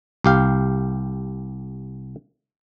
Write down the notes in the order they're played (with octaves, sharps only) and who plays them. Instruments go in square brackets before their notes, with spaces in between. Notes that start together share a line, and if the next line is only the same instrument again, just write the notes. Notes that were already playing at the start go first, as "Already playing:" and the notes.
[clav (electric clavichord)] C2 G4 F5